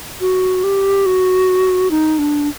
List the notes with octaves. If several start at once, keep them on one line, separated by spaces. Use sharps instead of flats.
F#4
G4
F#4
D#4
D4